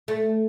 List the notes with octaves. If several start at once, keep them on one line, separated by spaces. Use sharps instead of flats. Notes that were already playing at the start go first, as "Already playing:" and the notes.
A3